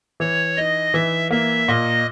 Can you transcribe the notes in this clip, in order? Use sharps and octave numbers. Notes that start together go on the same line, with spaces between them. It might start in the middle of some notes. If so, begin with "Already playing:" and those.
E3 C#5
D#4 D#5
E3 E5
A#3 E5
A#2 D#5